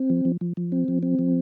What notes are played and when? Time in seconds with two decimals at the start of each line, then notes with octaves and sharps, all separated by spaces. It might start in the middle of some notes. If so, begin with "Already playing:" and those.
Already playing: C4
0.10 F3
0.25 F3
0.41 F3
0.57 F3
0.72 C4
0.88 F3
1.03 C4
1.19 F3